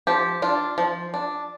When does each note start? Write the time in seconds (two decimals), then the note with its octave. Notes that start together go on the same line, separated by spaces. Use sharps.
0.07 F3 G4
0.42 D4 F4
0.78 F3
1.14 D4